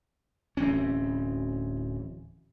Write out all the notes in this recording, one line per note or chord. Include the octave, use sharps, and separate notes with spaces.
D1 E3 C4 C#4